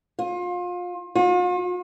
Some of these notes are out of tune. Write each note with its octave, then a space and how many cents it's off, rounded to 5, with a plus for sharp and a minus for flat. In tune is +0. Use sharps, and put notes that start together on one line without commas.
F4 +30
F4 +45